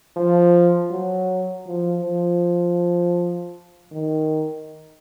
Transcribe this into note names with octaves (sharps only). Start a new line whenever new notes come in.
F3
F#3
F3
F3
D#3